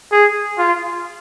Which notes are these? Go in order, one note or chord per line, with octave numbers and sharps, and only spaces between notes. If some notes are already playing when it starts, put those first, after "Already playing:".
G#4
F4